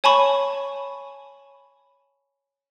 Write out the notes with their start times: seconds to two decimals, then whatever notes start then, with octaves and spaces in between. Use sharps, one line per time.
0.04 C#5 G#5 A5 B5 C#6